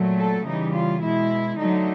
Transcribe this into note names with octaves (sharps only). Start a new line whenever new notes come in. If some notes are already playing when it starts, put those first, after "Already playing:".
Already playing: A#2 F#3 A3
A4
C#3 E3 G3 D#4
F4
B2 G#3 E4
D3 F#3 A3 D#4